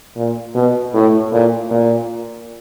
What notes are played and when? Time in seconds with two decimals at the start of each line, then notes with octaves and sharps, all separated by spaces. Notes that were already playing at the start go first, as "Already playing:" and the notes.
0.17 A#2
0.55 B2
0.94 A2
1.32 A#2
1.71 A#2